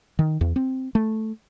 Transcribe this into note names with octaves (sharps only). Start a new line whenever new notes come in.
D#3
E2
C4
A3